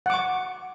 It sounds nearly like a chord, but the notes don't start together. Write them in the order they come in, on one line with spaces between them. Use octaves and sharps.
F#5 D6 C#6